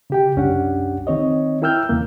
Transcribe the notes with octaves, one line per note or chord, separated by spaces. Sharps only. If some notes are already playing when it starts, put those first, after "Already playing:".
C#3 G4 G5
C2 F#2 C#4 D4 G4 F#5
D#3 C4 C#5 D#5
E4 A#4 G5 E6 F6 G6
E2 C#3 A#3